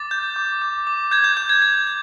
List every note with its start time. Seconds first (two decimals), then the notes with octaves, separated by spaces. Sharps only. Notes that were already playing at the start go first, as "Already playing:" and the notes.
Already playing: D6 A6
0.11 G6
0.36 D6
0.62 D6
0.87 D6
1.11 G6 G#6
1.24 G6
1.37 D6 G6
1.49 G#6
1.62 G6 G#6
1.87 G6